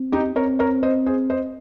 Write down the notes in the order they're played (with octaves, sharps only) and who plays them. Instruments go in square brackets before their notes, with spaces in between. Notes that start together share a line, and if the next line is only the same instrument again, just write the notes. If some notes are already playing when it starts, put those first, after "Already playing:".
Already playing: [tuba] C4
[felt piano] D#4 G4
[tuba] C4 [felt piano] A#4 C#5
[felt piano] A#4 C#5
C5 D#5
G#4 C5
C5 D#5